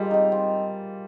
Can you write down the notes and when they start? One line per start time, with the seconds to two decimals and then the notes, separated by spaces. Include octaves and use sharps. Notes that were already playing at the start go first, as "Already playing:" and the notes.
Already playing: G3 G#3 A#3 F4
0.11 C4 D#4
0.32 C4